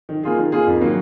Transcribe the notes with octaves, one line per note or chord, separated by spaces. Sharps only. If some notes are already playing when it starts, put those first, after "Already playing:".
D#3
A#3 F4 G#4
D#3
A#3 F4 G#4
F2
D#3 F#3 A#3